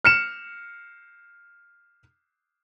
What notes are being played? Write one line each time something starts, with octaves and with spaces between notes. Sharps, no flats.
F6 C#7 E7